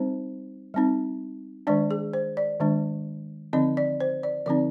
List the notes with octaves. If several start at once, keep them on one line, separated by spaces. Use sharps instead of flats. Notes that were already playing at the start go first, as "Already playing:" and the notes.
Already playing: G3 C4 D#4 C5
G3 C4 D#4
D#3 G#3 D4 D5
G#4
C5
D5
D#3 G#3 D4
D3 F3 C4 D#4 D#5
D5
C5
D5
D3 F3 C4 D#4 D5